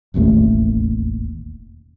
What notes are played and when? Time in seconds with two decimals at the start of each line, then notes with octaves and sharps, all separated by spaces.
0.14 E1 A1 D#2 A3